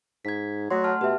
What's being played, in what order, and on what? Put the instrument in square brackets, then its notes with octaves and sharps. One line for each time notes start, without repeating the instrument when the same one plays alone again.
[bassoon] G#2 [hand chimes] G#6 B6
[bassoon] F#3 [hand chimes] A3 C6
[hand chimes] F#5 A5 F6
[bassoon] B2 [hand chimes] G4 E5